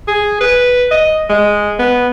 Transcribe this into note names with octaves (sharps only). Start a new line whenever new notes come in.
G#4
B4
D#5
G#3
B3